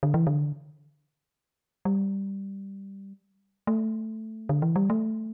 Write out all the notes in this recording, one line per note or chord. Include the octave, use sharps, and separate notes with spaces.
D3
E3
D3
G3
A3
D3
E3
G3
A3